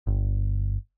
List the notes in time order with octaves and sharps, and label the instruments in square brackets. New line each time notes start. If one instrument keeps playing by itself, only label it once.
[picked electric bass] G1